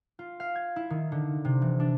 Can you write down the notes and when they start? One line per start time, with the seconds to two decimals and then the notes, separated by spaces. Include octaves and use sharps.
0.19 F4
0.40 F5
0.55 G#6
0.76 E4
0.90 D#3
1.12 D3
1.45 C3
1.62 E3
1.80 D4